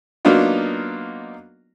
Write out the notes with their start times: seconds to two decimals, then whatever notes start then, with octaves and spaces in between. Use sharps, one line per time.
0.25 F#3 A#3 B3 D4 D#4 F4